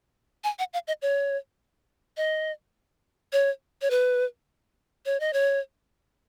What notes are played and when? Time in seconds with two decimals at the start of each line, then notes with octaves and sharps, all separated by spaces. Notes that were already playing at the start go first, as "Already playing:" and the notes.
0.44 G#5
0.59 F#5
0.73 F5
0.88 D#5
1.02 C#5
2.17 D#5
3.33 C#5
3.82 C#5
3.90 B4
5.06 C#5
5.20 D#5
5.33 C#5